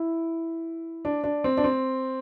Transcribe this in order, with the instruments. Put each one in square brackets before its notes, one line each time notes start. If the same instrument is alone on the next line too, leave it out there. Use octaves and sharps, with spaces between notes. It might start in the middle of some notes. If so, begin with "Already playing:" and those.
Already playing: [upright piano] E4
D4
D4
C4
D4
C4